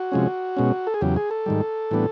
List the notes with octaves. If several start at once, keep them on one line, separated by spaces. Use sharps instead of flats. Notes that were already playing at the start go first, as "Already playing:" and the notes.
Already playing: F#4
C3 F3 G#3 C#4
B2 G#3 C#4
A4
G#4
E2 C#3 F#3 G4
G#4
A4
G#2 D#3 G3
A2 E3 G3 B3 D4